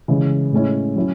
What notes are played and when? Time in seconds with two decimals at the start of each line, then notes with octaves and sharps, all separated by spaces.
0.08 C#3 E3 G#3
0.52 A2 G#3 C#4 E4
0.96 F#3 C#4 E4